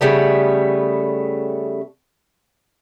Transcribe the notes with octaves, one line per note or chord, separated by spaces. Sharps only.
C#3 G3 A3 B3